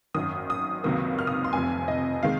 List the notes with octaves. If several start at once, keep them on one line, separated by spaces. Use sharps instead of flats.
G#1 F#2 D#3 D#6
D#6
C#2 C3 D#3 F#3 A#3 D#6
F6
D#6
C6
F1 F2 C3 G#5
D#5
C3 D#3 G#3 F5